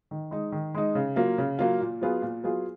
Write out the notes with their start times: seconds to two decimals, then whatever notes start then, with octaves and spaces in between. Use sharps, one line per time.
0.11 D#3
0.31 G#3 D#4
0.52 D#3
0.75 G#3 D#4
0.95 C#3
1.16 F#3 A#3 F4
1.38 C#3
1.59 F#3 A#3 F4
1.81 A#2
2.01 F#3 B3 F4 G#4
2.22 A#2
2.44 F#3 B3 F4 G#4